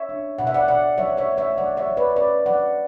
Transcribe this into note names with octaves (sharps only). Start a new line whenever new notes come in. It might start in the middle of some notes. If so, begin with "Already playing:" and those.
Already playing: C#5 E5
D4
B2 F#5
E5
D5 F#5
B2 D5 F#5
F#3 C#5 E5
C#5 E5
A3
C#5 E5
F#3 D5 F#5
C#5 E5
F#3
B4 D5
C#4 B4 D5
F#3 D5 F#5